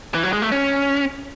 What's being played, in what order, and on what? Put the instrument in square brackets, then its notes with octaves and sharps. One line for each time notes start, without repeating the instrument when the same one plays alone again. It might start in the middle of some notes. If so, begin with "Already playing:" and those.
[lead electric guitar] E3
F#3
G#3
A3
C#4